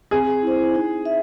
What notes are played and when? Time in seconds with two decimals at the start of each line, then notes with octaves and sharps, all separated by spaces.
0.11 C4 G#4
0.42 E4 C5
0.74 D#4
1.05 E5